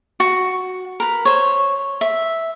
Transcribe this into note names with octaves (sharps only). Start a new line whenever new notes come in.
F#4
A#4 B4
C5 C#5
E5